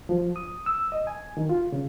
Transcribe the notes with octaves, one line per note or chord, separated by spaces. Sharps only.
F3
D#6
E6
D#5
G#5
D#3
F4
C#3